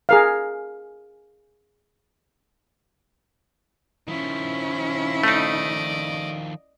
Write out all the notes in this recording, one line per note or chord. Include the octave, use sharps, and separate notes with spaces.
G#4 A#4 F5
D#3 F3 C#4 E4
A3 D#4 D5 D#5